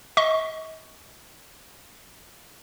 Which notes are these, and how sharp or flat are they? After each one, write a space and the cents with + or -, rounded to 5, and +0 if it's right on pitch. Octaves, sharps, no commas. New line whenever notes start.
D#5 +40 C#6 +5